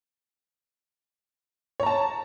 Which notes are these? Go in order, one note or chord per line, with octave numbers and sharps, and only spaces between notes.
C#5 A5 A#5